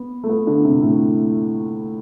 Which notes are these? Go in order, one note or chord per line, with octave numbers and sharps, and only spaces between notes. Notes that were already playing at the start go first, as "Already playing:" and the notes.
Already playing: B3
A3
B3
D3
C3
A2